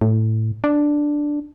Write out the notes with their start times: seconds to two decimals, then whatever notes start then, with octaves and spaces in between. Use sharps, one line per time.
0.01 A2
0.64 D4